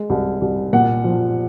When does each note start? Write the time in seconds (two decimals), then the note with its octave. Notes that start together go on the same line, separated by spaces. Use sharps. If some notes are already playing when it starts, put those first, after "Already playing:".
Already playing: G#3
0.10 C2
0.41 C2
0.73 A#2 F#5
1.04 F3